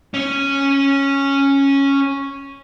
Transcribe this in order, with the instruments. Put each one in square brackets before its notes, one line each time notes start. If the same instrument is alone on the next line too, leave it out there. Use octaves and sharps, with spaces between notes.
[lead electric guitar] C#4 C#5